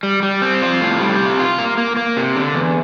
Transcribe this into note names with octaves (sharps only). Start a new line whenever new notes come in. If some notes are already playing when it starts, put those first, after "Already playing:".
G3
G3
C4
F4
A2
G3
C3
F4
A#3
A#3
A#3
C3
D3
E2